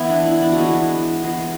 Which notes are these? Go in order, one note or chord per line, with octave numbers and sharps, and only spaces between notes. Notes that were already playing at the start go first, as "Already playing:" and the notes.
Already playing: E3 B3 E4
D4
E4
D4
F#4
E3 G#3 B3 E4
E3 G#3 B3